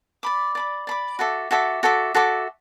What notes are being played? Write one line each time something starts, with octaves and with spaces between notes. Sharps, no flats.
D5 B5 D6
D5 B5 D6
D5 B5 D6
F#4 A4 E5 D6
F#4 A4 E5 D6
F#4 A4 E5 D6
F#4 A4 E5 D6